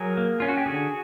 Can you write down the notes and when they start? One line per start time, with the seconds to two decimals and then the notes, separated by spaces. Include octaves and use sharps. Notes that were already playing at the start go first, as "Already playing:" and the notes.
Already playing: F#3 G#4 A#4
0.17 A#3
0.40 C#4 F4
0.49 F#4
0.57 G4
0.66 D3 F#4 G#4